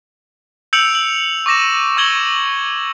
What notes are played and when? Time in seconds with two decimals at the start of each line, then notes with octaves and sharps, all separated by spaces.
0.73 E6 G6 C#7 D7 F7 F#7
0.95 F#7
1.46 C#6 D6 A#6 E7
1.97 C#6 E6 G#6 F#7 G7